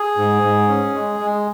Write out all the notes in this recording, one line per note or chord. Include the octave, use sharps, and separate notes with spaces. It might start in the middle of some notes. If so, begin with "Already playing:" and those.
Already playing: G#4
G#2
G#2
C#4
G#3
G#3